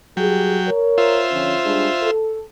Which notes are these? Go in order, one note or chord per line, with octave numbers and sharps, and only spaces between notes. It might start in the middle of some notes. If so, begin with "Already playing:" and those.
F#3 G3 G4 G#4 G5
A#4 C#5
F4 C5 E5
D3 F3 C#4
G3 G#3 D4
A4